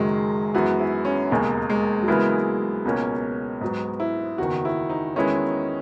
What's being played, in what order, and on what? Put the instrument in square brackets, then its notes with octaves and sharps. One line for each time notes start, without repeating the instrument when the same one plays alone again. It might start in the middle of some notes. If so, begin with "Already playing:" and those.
Already playing: [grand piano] F#1 F#2 D#3 F#3 [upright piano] G#3
[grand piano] F#2 E3 B3 [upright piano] F#4
[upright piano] E4
C#4
[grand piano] E1 D#2 C#3 G#3 [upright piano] A#3
[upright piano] G#3
F#3
[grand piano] C#3 E3 B3 E4 A#4 [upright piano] G#3
[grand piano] C#2 B2 A#3 C#4
G#2 F#3 B3
[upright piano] E4
[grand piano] F#1 E2 D#3 [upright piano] F#4
[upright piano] E4
D#4
[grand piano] E2 D#3 G#3 B3 E4 [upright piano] C#4